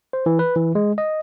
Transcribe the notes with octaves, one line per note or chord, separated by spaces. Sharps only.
C5
E3
B4
E3
G#3
D#5